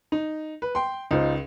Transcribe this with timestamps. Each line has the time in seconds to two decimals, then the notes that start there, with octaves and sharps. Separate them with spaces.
0.12 D#4
0.62 B4
0.75 G5 C6
1.11 C#2 D#4 F4 C5